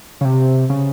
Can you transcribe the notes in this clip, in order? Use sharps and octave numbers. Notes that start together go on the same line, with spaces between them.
C#3
C3
C#3